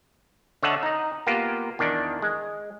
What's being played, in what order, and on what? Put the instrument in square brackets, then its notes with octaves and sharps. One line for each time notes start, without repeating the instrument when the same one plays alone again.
[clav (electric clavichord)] D3 C#5 D#5 E5 F#5 A5
D#4 D#5
A#3 B3 F4 G4
E2 D#3 D4
G#3